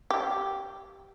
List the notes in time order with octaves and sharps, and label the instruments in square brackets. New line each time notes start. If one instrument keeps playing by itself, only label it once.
[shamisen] G4